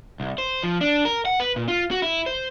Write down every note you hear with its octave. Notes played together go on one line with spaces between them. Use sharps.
C2
C5
F3
D4
A#4
F#5
B4
A#2
F4
F#4
E4
C5